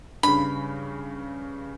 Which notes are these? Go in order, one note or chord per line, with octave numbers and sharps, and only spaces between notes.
G2 C#3 D4 B5